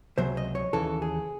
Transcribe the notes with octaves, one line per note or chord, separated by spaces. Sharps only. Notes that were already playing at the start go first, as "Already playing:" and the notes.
C#2 C3 F#3 C5
D#5
C#5
D#2 C#3 E3 A4
G#4